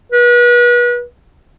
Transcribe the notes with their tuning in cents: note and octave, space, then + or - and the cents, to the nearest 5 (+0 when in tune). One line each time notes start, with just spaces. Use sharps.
B4 -35